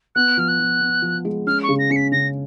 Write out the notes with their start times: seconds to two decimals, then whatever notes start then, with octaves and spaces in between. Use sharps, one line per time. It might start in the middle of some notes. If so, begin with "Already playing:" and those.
0.15 B3 F#6
0.37 F3 F6
0.48 F#6
0.59 F3
0.81 B3
1.02 F3
1.25 G#3
1.46 C#4 F6
1.63 C#6
1.69 C#3
1.79 A#6
1.90 C#4 C#7
1.96 B6
2.12 C#3 A#6